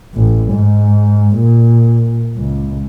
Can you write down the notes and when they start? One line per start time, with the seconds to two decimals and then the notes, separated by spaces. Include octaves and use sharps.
0.15 A1
0.52 G#2
1.37 A#2
2.38 C#2